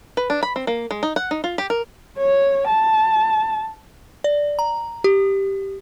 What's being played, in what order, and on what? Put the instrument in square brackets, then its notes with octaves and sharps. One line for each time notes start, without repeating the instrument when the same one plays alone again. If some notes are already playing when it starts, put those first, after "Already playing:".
[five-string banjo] B4
D4
B5
C4
A#3
G#3
D#4
F#5
D#4
F4
G4
A#4
[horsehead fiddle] C#5
A5
[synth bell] D5
A#5
G4